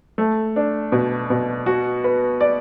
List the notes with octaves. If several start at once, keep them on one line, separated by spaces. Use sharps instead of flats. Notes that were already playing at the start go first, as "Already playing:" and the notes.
A3
D4
B2
B2
F#4
B4
D5